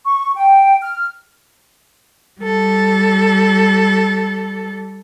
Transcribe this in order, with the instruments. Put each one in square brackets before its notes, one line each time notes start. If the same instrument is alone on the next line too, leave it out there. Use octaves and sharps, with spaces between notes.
[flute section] C#6
G5
F6
[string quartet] G3 A4